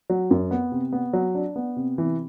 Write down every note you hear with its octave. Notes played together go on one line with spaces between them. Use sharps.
F#3
F#2
B3
C3
B3
F#3
D4
B3
C3
E3